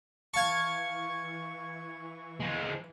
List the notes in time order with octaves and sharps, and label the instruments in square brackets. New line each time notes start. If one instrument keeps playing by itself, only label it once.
[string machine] E3 [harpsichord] F5 A5 [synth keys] C#6 G#6
[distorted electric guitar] F3 G#3